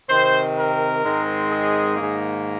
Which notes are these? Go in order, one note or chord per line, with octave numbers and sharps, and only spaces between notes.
C3 D#3 C4 C5
A#4
G#2 D#3 G#3 C4
G#4
G#2 D#3 A#3